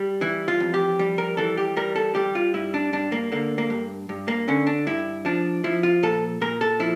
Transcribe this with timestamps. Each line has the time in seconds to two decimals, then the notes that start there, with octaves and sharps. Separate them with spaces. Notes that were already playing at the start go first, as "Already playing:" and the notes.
Already playing: G3
0.21 E3 E4
0.48 F4
0.60 F2
0.74 G4
0.99 G3
1.18 A#4
1.37 E3 A4
1.57 G4
1.77 G3 A#4
1.96 A4
2.15 G3 G4
2.35 F4
2.54 G2 E4
2.74 D4
2.93 G2 D4
3.12 A#3
3.32 D3 A#3
3.58 A#3
3.70 G2
4.09 G2
4.28 A#3
4.48 D3 C#4
4.67 D4
4.87 G2 E4
5.25 F3 D4
5.64 F3 E4
5.83 F4
6.03 A#2 A4
6.41 A#2 A#4
6.61 A4
6.80 F3 E4